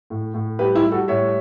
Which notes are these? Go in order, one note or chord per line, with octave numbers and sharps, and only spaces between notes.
A2
A2
G3 G4 B4
E4 G4
G3
F#4 A4
A2 C#5 E5